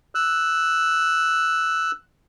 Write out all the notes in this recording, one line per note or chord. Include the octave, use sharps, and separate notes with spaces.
E6 F#6